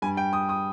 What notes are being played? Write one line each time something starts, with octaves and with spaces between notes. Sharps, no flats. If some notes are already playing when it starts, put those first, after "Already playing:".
G2 G3 G#5
G5
D#6
D#6